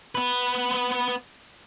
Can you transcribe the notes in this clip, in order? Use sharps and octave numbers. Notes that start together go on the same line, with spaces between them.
B3 B4